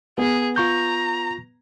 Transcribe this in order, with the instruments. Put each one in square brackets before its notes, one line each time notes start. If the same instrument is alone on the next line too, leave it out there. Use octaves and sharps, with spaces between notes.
[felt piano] B3 [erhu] G#4
[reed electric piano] F4 C#6 G6 [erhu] A#5